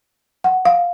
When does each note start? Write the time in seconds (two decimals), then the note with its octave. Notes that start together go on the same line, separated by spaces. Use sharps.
0.44 F#5
0.65 F5